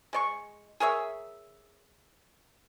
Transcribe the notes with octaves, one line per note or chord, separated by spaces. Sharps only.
G#3 D5 C#6
G#4 A#4 C#5 E5